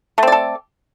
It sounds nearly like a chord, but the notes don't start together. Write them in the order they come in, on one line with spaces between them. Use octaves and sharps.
A3 C4 D5 A4